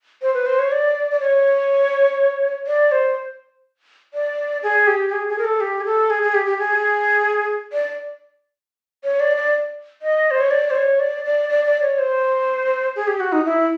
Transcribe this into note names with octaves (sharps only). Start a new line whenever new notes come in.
C5
B4
C5
C#5
D5
D5
C#5
D5
C5
D5
G#4
G4
G#4
G#4
A#4
A4
G4
G#4
A4
G#4
G#4
G4
G4
G#4
D5
C#5
D5
D5
D#5
C5
C#5
D5
C5
C#5
D5
D5
D5
D5
C#5
C5
G#4
G4
F#4
D#4
E4